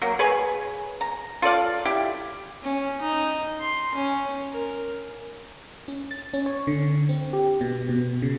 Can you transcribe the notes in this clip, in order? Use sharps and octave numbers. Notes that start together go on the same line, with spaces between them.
F#3 A#3
G#4 B4 C#5 G#5
A#5
F4 A4 D5 F5
E4 G4
C#4
D#4
C6
C#4
A#4
C#4
A6
C#4
C#5
D3
C4
G4
B2
B2
C#3